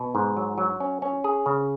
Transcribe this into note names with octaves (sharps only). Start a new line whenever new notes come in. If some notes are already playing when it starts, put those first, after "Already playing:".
Already playing: B2
G#2
F#3
F#3
C#4
C#4
G#4
C#3